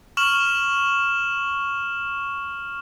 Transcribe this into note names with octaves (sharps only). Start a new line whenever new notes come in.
C#6 F6 E7 F#7